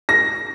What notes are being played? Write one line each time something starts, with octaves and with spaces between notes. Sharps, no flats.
A#6